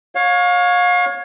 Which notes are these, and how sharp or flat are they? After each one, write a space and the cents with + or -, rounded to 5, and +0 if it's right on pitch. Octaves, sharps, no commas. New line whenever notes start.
C#5 +0 F5 +35